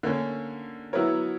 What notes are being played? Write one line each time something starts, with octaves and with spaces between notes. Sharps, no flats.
D3 A#3 C#4
F#3 B3 E4 A#4 C#5